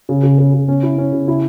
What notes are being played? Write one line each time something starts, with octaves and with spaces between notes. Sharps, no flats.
C#3
C#3
C#3
C#3
C#4
E4
C#4
C#3
E4